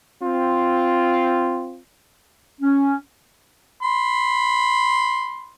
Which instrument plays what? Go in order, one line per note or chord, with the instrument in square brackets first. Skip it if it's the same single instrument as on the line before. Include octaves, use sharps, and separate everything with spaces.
[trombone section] C4 F4
[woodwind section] C#4
[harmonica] B5 C6